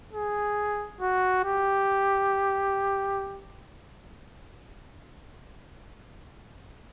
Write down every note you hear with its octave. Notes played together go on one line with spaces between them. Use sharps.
G#4
F#4
G4